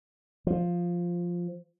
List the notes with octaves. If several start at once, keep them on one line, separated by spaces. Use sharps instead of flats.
F3